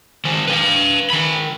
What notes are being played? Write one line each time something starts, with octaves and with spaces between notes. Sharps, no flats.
D#3 C5
B4 F5
D#3 B5